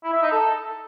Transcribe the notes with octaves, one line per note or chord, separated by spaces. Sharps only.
E4
E5
D#4
A4